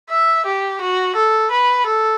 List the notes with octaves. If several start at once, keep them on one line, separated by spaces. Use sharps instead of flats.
E5
G4
F#4
A4
B4
A4